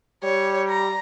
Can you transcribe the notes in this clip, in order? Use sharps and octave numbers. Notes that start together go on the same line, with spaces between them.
G3 C#5
A#5